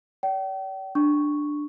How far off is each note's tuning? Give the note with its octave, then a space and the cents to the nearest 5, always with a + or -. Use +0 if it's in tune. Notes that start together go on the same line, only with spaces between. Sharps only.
D5 -40 G5 -40
D4 +10 C#6 +0